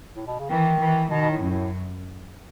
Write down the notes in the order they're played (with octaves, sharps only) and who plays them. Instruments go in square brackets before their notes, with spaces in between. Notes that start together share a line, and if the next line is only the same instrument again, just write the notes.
[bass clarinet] A2
B2
C#3
[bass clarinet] D#3 [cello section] E3
[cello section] E3
[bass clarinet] B2 [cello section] D#3
[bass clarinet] B2
A2
[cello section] F#2
[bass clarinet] A2